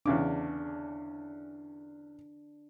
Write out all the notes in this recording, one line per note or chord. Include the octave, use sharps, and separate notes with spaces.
E2 C#3 D4 D6